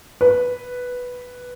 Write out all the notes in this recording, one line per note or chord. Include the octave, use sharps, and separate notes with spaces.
B4